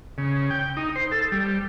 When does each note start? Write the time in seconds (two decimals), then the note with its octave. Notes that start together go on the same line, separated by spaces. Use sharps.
0.18 C#3
0.50 G5
0.77 D#4
0.96 C5
1.11 A4
1.32 G3